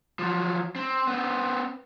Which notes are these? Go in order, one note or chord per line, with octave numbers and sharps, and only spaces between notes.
F3 F#3
C4
B3 C4